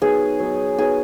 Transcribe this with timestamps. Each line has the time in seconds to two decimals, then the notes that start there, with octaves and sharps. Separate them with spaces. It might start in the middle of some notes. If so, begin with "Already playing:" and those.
0.02 F#3 B3 D#4 G#4
0.39 F#3 B3 D#4
0.78 F#3 B3 D#4 G#4